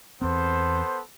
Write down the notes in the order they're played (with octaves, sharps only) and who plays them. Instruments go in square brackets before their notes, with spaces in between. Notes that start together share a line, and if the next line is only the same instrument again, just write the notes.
[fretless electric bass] E2 C4 [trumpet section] B3 A4 C5